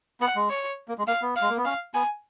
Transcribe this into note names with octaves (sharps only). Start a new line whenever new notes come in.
B3 F#5
G#3
C#5
A#3
G#3
A#3 F5
B3
F5
G#3
A#3
B3
C#4 F5
B3 G#5